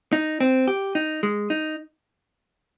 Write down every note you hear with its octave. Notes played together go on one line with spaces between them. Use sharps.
D#4
C4
G4
D#4
G#3
D#4